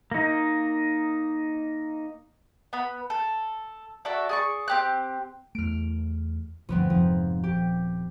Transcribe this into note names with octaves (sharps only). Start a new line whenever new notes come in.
A#3 D#4
B3 B5
A4
F#4 A4 D5 E5
G#4 D5 C#6
C4 G4 F#6
E2 A3 F6 D7
E1 D2 G2 F3 B3 C4
F1 F2 G#2 F3
D#1 G4